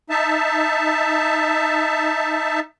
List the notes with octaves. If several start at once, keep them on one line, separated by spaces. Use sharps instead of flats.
D#4 E5 A5